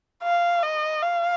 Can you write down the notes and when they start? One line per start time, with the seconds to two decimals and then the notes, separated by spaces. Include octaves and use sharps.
0.23 F5
0.63 D#5
1.02 F5